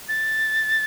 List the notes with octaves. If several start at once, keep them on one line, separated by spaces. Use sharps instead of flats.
A6